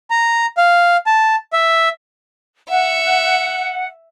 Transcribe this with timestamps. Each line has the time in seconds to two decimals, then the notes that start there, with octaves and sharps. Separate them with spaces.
0.10 A#5
0.57 F5
1.07 A5
1.53 E5
2.69 E5 F#5